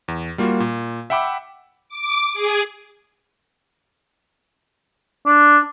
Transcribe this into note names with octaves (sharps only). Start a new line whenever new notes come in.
E2
G3 A#3 F4 F#4
A#2
E5 F#5 G5 B5 D6 E6
D6
G#4
D4